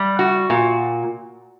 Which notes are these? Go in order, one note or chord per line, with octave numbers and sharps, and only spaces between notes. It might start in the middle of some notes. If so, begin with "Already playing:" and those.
Already playing: G3
F#4
A#2